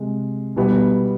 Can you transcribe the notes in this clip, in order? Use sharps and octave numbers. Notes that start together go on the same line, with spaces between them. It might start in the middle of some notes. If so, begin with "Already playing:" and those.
Already playing: C3 G#3
B2 G3 B3 E4